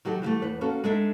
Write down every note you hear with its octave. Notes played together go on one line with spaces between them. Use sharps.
D#3 F#3 G4 A4
E3 F3 G3 A3
E2 B4
A#3 C#4 F#4 A4
G#3 D4 D#4 A4 E5